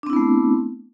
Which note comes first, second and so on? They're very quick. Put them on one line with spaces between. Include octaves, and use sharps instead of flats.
D4 C4 E4 B3 A3